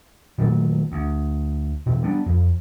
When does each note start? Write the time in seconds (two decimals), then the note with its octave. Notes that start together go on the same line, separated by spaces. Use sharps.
0.38 A#2 D#3 F#3 A3
0.92 D2
1.86 B2 E3
2.02 G3 B3 D4
2.26 F2